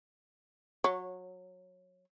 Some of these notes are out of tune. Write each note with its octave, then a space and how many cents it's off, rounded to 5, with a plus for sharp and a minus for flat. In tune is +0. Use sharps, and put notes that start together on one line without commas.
F#3 -20 C#5 +0